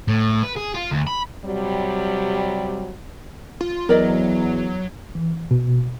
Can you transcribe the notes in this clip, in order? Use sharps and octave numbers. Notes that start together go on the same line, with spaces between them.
A2
B4
G#4
F4
D2
B5
C3 F#3 G3
F4
E2 F#3 A#4 D5 D#5
E3
B2